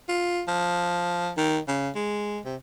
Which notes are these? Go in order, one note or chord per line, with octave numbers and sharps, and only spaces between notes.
F4
F3
D#3
C#3
G#3
C3